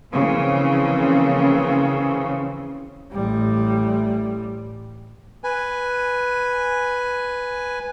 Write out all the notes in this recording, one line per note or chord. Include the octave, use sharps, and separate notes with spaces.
C#3 E3 F3 A#3 C4
A1 G3
B4 G#5